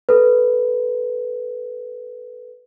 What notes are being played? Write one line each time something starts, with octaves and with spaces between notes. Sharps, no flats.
A4 B4